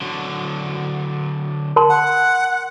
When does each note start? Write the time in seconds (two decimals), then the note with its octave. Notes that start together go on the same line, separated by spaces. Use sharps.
0.01 D3 F#3
1.76 A#4 A5 C6
1.89 F#5